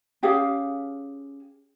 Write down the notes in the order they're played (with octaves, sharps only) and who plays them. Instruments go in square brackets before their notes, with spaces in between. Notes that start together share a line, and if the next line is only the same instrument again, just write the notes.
[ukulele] C#4 G4 G#4 F5